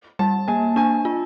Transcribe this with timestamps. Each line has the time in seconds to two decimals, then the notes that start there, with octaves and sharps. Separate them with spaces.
0.19 G3 A5
0.48 A#3 G#5
0.76 D4 G#5
1.05 F4